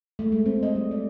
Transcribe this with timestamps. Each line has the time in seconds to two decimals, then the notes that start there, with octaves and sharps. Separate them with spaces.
0.19 A3
0.32 G#3
0.46 C4
0.63 D#5
0.75 G3
0.91 D5